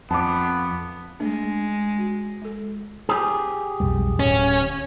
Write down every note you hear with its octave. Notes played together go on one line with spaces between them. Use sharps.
F2 B3 A5 D6
G#3 A3 D4
F#4
G#3 A4
G4 G#4
B1 F2 G3
D1 C#4